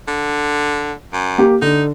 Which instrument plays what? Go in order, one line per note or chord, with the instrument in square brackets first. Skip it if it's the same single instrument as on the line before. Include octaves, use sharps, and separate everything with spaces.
[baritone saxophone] D3
F#2
[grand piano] A#3 G4
[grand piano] D3 [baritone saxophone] D#4